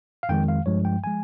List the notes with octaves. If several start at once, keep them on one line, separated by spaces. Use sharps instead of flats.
F5
F2 D#3 G#3 G5
F5
G2 F3 G#3 C#5
G5
F3 G#3 G#5